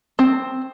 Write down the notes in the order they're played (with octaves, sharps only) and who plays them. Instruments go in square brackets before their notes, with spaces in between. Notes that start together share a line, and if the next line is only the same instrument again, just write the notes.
[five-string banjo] C4